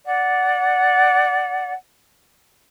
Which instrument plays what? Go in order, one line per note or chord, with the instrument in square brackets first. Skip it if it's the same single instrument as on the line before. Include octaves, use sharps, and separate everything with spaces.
[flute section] D5 F#5